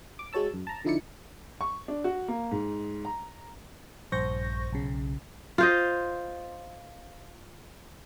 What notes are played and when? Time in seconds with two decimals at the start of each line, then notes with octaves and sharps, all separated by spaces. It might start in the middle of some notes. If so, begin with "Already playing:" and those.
0.19 D6
0.33 G#3 F#4 C#5 A5 E6
0.54 F#2
0.67 A5 A#5
0.85 D3 F3 D#4 E4 D5 C#7
1.61 C#6
1.88 D4
2.04 F#4
2.28 A#3
2.51 G#2
3.05 A#5
4.12 A#1 G2 C5 C#6 G6 A#6
4.72 B1 C#3
5.58 F4 C5 D#5